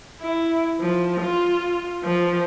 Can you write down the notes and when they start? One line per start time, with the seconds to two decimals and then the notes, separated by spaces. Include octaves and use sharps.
0.21 E4
0.80 F3
1.22 F4
2.04 F3